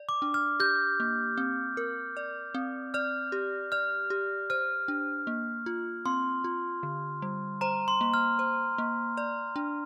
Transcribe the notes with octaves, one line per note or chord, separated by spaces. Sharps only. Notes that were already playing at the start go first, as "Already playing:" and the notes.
Already playing: D5
D6
D4
F6
G4 G6
A#3
C4
A#4
D5
C4
D5 F6
G4
D5 F6
G4
C5 F6
D4
A#3
F4
C4 C6
F4
D3
G3
C5 A#5
C6
A#3
F6
C5
A#3
D5
D4